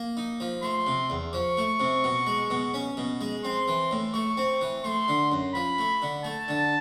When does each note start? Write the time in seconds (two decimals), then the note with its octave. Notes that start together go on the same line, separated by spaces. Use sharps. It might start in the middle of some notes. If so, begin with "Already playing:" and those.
Already playing: A#3
0.17 D#4
0.40 F3
0.63 A3 C6
0.87 C3
1.10 E2
1.33 F3 C#6
1.57 A3
1.80 C3
2.04 B2
2.27 G#3
2.50 B2
2.74 C#4
2.97 B2
3.21 G#3
3.44 C4 C6
3.68 E3
3.91 A2
4.14 A3 C#6
4.37 C4
4.61 E3
4.84 A3 C6
5.08 D3
5.32 F#2
5.55 F3 B5
5.78 A3
6.02 D3
6.24 A3 A5
6.48 D3